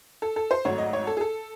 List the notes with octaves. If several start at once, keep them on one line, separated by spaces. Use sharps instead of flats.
A4
A4
C5
G#1 G#2 F#3 A3 C#5
D#5
C#5
A4
G#4
A4